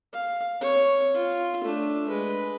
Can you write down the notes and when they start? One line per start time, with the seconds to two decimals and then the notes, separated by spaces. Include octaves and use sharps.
0.13 F5
0.60 C4 C#5
1.15 F4
1.64 A3 D4
2.08 G#3 B4